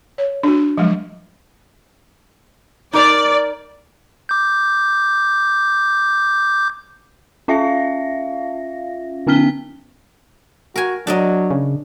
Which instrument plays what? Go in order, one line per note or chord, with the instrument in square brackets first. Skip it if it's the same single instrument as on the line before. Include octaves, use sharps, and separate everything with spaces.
[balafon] C#5
D4 F#4
F3 F#3 G#3
[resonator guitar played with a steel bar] D#4 A#4 A#5 [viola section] D5 [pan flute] D6
[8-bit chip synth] D6 G6
[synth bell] C#4 F4 E5 F5 A#6
D3 B3 C#4 F6 B6 G7
[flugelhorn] F#4 [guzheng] A#4 G#5
[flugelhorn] F#3 [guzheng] D4 A#4 D#5
[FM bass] C#3